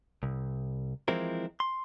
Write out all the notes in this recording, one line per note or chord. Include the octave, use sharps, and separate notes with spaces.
C2
E3 F3 G#3 C4 E4 A#4
C6